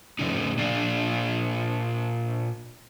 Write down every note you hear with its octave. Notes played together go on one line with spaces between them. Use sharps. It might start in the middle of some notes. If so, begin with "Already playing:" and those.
F2 A2 C#3 C#4 D#4
A#2 D4 F5